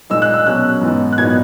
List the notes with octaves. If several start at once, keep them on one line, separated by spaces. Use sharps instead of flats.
A#2 G#3 D#4 E6
F#6
E6
B2 F#3 C#4 F#6
G#2 E3 B3 D#4
F#6
A#2 F#3 B3 D#4 G#6